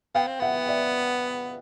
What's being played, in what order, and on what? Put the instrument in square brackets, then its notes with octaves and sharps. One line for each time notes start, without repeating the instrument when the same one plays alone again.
[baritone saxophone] B3 [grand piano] F5 G5
[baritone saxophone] C4
[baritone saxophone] B3 [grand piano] E5 F#5
[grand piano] D5 E5